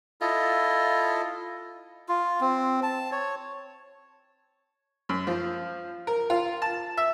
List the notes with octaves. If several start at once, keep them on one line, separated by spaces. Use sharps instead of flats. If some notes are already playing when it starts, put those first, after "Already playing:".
E4 F4 A4 D#5
F4
C4
A5
C#5
F#2
F3
A#4
F4
A5
E5